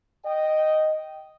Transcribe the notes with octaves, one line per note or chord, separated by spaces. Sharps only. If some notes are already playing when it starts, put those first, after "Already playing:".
D#5 G5